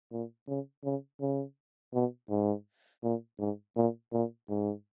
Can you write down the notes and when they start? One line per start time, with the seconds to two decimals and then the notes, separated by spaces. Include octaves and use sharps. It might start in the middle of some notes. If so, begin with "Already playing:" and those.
0.12 A#2
0.48 C#3
0.84 C#3
1.21 C#3
1.94 B2
2.30 G#2
3.03 A#2
3.39 G#2
3.76 A#2
4.13 A#2
4.49 G#2